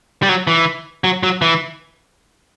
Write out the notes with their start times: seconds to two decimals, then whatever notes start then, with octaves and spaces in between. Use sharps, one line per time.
0.23 G3
0.29 F#3
0.47 E3
1.04 F#3
1.23 F#3
1.42 E3